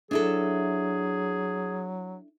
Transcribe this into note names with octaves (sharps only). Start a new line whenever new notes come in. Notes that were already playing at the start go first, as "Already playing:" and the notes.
F#3 D4 E4 G#4 A4